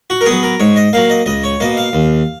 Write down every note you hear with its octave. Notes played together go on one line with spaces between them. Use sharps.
F#4
A#4
B3 G#4
F#3
A#4
G#2 C#5
D#5
F#3 A#3 F5
D#5
C#2 D#5
C#5
B2 A#3 D#5
F5
D#2